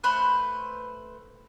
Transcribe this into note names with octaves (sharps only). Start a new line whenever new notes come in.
A3 B4 C5 F#6